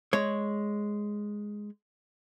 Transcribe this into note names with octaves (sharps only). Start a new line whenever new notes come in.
G#3 C#5